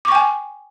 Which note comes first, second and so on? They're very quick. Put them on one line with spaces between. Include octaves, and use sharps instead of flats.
D6 C#6 G5 G#5